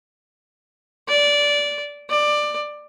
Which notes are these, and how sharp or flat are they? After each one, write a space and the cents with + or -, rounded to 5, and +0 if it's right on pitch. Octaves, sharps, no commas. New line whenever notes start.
D5 -15
D5 +15